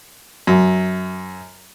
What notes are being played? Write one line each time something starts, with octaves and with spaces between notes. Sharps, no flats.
F#2